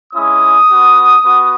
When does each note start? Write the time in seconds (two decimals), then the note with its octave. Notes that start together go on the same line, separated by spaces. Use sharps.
0.13 G#3 C#4 E4 D#6
0.69 B3 F#4
1.25 B3 F#4